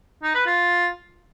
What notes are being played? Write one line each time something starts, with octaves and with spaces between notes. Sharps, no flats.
D#4
B4
F4